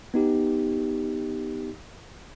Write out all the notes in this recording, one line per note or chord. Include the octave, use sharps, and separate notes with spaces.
B3 D#4 G4